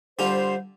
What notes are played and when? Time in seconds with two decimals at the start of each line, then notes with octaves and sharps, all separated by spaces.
0.19 D3 G3 D4 F4 C5